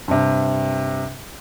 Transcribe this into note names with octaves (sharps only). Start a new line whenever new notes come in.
G2 C3